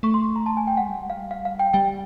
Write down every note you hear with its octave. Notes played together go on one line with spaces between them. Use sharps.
A3 C#6
C6
A#5
A5
G#5
G5
F#5
G#3
G3
F5
F5
F5
G5
G3 G5